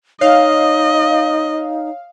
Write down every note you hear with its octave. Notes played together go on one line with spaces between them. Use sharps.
D#4 C#5 D#5 F5